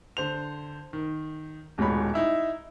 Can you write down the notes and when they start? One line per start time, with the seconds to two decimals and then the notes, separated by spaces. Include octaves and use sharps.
0.17 D3 C5 F7
0.93 D#3
1.78 D#1 G#2 B2 G#3 C#5 B5
2.14 D#4 E4 E5